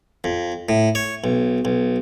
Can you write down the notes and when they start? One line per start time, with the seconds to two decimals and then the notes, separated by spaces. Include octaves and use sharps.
0.24 F2
0.69 A2
0.95 C#5
1.24 B1
1.65 B1